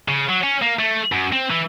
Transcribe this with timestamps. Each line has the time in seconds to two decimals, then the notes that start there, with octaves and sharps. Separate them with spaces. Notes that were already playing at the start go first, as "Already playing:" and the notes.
0.08 C#3
0.29 F#3
0.43 C#4
0.62 A#3
0.79 A3
1.12 F#2
1.32 C4
1.50 E3